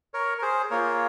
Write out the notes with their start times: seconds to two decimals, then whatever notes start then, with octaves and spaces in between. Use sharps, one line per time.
0.14 A#4 C#5
0.38 A#4
0.42 G#4 C5
0.70 A#3 F4 G#4 A#4 C#5